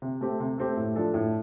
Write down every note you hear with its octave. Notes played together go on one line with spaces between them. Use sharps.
C3
A3 C4 G4
C3
A3 C4 G4
A2
F3 D4 A4
A2